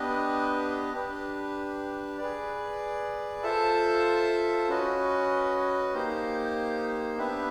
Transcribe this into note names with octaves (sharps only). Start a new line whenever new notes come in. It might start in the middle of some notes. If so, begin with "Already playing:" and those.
Already playing: B3 D4 G4 B4 D#5
D4 G4 B4
G#4 B4 D5
F4 A4 C5 E5 A5
C#4 F#4 B4 D#5
A#3 D#4 G4 C5
B3 D4 G4 B4 E5